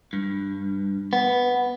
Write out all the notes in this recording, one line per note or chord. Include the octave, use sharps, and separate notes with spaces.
G2
B3